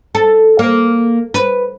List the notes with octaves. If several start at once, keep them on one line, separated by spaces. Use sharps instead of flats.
A4
A#3
B4